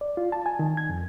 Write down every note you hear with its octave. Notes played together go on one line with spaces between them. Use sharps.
D5
F4
A5
G#5
D#3
G#6
F2